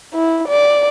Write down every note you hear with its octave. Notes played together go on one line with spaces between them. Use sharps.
E4
D5